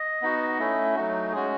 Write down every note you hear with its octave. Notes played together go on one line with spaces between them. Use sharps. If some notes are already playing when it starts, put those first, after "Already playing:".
Already playing: D#5
B3 D#4 F#4
A3 C#4 E4
F#3 A3 D#4 F#4
G#3 C#4 F#4 G#4